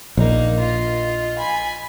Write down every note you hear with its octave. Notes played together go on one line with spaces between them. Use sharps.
A#1 A#3 D#4
F4 D#5
G#5 B5